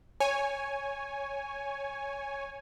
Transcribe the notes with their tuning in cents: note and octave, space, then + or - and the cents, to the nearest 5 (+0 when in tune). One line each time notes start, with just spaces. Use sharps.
C#5 +0 G#5 +0